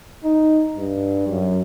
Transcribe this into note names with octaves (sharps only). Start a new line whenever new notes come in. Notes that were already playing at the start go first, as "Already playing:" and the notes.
D#4
G2
F#2